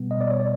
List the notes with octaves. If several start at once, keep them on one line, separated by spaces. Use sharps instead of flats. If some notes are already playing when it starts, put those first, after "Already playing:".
Already playing: B2 G3 B3
D#5
D5
C#5
D5